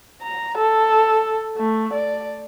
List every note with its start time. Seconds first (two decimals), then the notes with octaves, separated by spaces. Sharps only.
0.22 A#5
0.58 A4
1.57 A3
1.94 D5